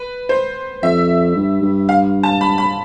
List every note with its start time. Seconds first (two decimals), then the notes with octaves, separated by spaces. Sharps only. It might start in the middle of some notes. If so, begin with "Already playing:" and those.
Already playing: B4
0.29 C5
0.82 F2 E5
1.36 G2
1.62 G2
1.89 F5
2.23 A5
2.41 B5
2.58 B5